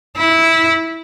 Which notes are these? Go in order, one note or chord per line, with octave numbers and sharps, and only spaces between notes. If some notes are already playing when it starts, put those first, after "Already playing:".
E4